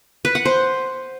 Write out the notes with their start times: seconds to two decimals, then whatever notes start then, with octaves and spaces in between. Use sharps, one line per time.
0.25 B4
0.35 F#5
0.45 C5